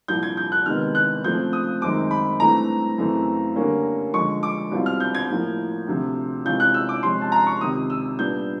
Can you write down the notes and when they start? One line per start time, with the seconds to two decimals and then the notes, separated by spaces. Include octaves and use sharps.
0.08 C2 A#2 F3 G6
0.23 G#6
0.37 G6
0.52 F#6
0.66 C3 D#3 G#3 B3 F6
0.95 F#6
1.24 C#3 F3 A3 C4 G6
1.53 D#6
1.82 F#2 D#3 G#3 C4 D#4 D6
2.11 B5
2.40 G2 E3 A3 C4 A#5
2.98 F#2 C#3 E3 A3 C4
3.56 G2 D3 G3 A#3 C#4
4.14 D3 F3 G#3 C#6
4.43 D6
4.71 C2 B2 G3 C4 F4
4.86 F6
5.00 G6
5.15 G#6
5.29 A2 F3 A#3
5.87 D2 C3 F3
6.45 C3 E3 G#3 C#4 F4 G6
6.60 F#6
6.74 E6
6.89 D6
7.03 C3 F3 G#3 C#4 C6
7.21 A5
7.32 A#5
7.47 C#6
7.61 C#2 C3 D#3 D#6
7.90 E6
8.19 A#2 G3 B3 D4 G6